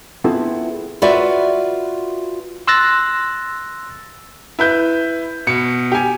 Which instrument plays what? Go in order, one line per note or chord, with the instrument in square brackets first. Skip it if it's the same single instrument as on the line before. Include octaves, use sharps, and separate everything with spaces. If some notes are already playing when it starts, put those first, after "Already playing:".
[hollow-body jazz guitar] B3 C4 E4 F4 G#4 A4
[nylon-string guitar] F4 F#4 B4 D5 E5
[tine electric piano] C6 E6 F#6 A6 A#6
[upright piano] E4 B4 G6
B2 C#7
G4 G#5